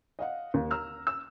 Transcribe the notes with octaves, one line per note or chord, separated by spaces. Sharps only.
D#5 F5 F#5
D#2
A#5 E6 F6
E6